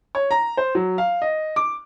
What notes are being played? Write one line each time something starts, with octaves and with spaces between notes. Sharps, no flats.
C#5
A#5
C5
F#3
F5
D#5
D6